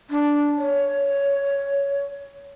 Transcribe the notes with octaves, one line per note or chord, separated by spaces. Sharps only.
D4
C#5